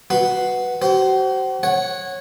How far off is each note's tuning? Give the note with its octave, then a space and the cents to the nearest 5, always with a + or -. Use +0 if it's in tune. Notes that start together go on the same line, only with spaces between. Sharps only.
F#4 +0 B4 +0 C6 +0
F#4 +40 C5 +0
C#5 -15 F#5 +0